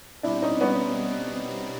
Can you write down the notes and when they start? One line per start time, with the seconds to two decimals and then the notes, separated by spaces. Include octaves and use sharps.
0.23 B2 G3 C4 D4 E4
0.42 C#4 D#4
0.61 B3 C#4